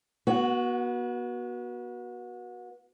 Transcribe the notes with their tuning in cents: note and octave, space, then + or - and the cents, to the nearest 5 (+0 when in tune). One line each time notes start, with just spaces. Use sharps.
B3 -35 F#4 +0